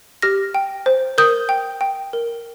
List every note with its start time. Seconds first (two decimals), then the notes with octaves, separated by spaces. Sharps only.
0.22 G4 F6 A#6
0.55 G5
0.86 C5
1.18 A#4 D#6 G6
1.49 G5
1.81 G5
2.13 A#4